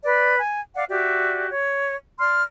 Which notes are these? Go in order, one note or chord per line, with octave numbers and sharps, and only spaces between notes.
B4 D5
G#5
D5 F5 F#5
F#4 G4 D5 E5
C#5
D5 C6 F6